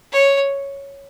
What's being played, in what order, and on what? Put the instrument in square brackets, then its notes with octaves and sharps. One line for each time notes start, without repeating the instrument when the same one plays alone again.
[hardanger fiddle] C#5